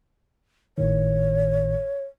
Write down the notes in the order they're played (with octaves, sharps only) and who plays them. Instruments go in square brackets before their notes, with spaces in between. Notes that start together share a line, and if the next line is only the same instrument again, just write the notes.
[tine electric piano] G#1 A2 D#3 [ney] C#5